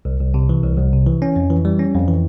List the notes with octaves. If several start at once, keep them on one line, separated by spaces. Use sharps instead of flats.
C2
C2
C3
E3
C2
C2
C3
E3
C#4
F2
E3
G3
C#4
F2
E3